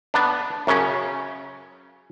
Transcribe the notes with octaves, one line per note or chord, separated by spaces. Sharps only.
B3 D4
F#2 C#3 C#4